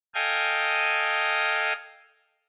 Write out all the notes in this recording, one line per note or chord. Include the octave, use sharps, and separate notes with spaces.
A4 D#5 F5 G5 G#5 D#6